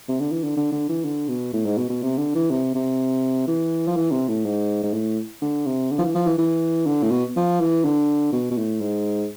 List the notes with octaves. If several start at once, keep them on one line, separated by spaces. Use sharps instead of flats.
C3
D3
E3
D3
D3
D3
E3
D3
B2
A2
G#2
B2
B2
C3
D3
E3
C3
C3
E3
F3
E3
C3
A2
G#2
G#2
A2
D3
C3
D3
F3
E3
F3
E3
E3
D3
A2
B2
F3
E3
D3
B2
B2
A2
G#2